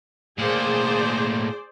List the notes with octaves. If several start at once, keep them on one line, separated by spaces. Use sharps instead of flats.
A2 A#3 G#4 C5 D5